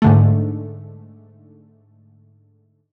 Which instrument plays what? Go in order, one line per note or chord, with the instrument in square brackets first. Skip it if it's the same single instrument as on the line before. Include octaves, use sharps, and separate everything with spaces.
[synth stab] G#2 D3 A3